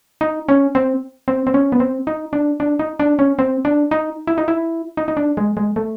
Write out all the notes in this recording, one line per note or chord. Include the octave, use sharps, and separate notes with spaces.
D#4
C#4
C4
C4
C4
C#4
B3
C4
D#4
D4
D4
D#4
D4
C#4
C4
D4
D#4
E4
D#4
E4
D#4
D#4
D4
G#3
G#3
A3